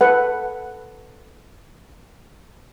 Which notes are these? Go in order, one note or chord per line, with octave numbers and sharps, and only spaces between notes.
A4 B4 F#5